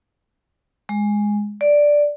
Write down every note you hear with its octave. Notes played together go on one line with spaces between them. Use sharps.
G#3
D5